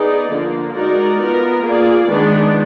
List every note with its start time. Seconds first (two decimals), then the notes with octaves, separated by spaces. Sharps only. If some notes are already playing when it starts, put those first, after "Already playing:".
Already playing: B3 D#4 G#4 D5
0.30 D3 F3 A#3
0.75 G#3 D#4 F#4 A#4 D5
1.20 B3 F4 A#4
1.65 A#3 F4 G#4 D5
2.10 D#3 G#3 B3 D4